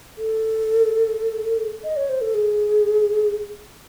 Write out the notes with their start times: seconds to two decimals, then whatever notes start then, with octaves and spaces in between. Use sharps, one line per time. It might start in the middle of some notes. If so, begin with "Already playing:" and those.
0.18 A4
1.84 D#5
1.96 C#5
2.09 C5
2.21 A4
2.34 G#4